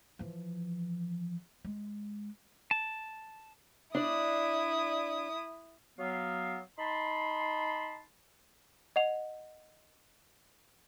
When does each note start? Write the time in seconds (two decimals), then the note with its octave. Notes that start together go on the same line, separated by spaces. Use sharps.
0.19 E3 F3
1.65 G#3
2.71 A5
3.95 D4 E4 D5 D#6
5.99 F#3 B3 F5
6.79 D#4 A5 B5 C6
8.96 D#5 F#5 F7